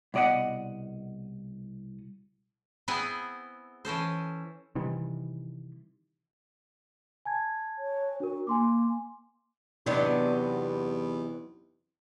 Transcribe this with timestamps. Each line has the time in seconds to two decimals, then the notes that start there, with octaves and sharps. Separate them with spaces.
0.14 C2 B2 D5 D#5 F#5
2.88 B3 C4 E4 G#4 F#5 G#5
3.85 E3 C#4 A4 C5
4.75 C3 D#3 E3 G3
7.25 G#5 A5 G#6
7.78 C#5
8.20 D4 F#4 A#4
8.47 A#3 G#5 C6 D6
9.86 E2 C3 F#3 B3 D4 D#4 G4